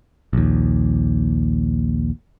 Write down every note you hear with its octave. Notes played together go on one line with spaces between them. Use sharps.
A#1 D#2